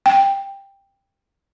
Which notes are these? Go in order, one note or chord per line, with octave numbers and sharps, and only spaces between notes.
G5